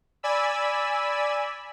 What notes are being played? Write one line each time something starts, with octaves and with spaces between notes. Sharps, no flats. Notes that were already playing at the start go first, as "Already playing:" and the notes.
D5 G#5 B5 E6